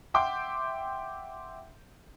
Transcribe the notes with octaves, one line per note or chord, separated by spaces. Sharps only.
E5 F#5 G5 C6 D6 G6